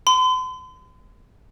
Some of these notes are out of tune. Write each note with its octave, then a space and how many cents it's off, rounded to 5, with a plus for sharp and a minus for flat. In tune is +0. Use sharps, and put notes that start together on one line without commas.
C6 -45